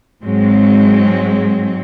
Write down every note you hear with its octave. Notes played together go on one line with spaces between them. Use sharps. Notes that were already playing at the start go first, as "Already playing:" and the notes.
G#2 F#3 G#3 C4